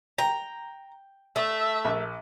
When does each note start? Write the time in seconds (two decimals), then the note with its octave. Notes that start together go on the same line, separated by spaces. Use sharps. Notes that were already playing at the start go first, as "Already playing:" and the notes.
0.18 G5 A#5
1.36 A3 E5
1.85 A#1